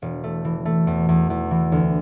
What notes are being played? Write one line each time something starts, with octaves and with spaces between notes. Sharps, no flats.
E1
A3
E3
A3
E2
E2
E2
E3
D2